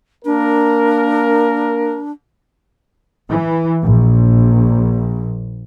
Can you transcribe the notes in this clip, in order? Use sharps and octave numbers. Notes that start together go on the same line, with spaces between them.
A#3 D4 A#4
E3
A#1